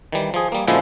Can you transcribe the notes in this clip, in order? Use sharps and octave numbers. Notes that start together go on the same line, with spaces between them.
D#3 E3 G3
F3 G#4
G3 A#3
F#2 A#2 D3 F3 G#3 E4